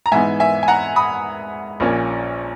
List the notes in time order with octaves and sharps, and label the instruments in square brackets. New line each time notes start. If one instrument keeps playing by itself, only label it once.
[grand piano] A#5
G#2 E3 B3 D#4 E5 G#5
E5 G#5
G#5
F#5 A#5
B5 D#6
A#1 A#2 A#3 C#4